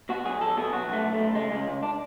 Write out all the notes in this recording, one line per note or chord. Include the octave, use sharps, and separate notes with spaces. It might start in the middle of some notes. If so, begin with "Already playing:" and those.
B2 F#4
B1 G#4
B1 A4
B2 G#4
B1 F#4
B1 A3
B1
A3
B1
C#2 G#3
C#2 G#3
C#2
D4